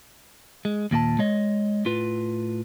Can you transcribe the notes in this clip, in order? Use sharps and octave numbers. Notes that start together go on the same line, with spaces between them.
G#3
D#2 A#2 F#4 A5
G#3 C#5 D#5
A2 F4 B4